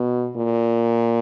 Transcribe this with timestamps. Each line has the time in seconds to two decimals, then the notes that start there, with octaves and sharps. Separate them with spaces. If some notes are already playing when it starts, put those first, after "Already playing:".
Already playing: B2
0.36 A#2